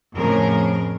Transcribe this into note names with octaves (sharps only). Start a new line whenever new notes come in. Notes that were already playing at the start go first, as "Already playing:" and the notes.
F2 A2 C#3 A#4